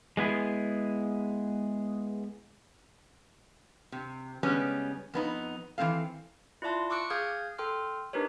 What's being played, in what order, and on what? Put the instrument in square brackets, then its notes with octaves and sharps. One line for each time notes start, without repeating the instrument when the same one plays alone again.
[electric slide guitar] G#3 B3 E4 G#4
[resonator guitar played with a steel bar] C3
C#3 G3 G#3 B3 C#4
F2 B3 D#4
E3 G#3 C4 A4 F5
[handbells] E4 F4 D5 E5 A5 C6
C#6 D6 E6 F#6 C#7 D7
G#4 F5 D#6 F6 G6 G#6
A4 G5 C6 F6
D4 D#4 G4 A#4 B4 C#5